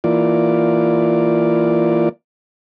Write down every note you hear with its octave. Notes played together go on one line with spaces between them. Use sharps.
E3 A#3 F4 D5